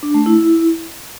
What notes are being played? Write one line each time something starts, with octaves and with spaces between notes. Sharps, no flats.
D4
A3
E4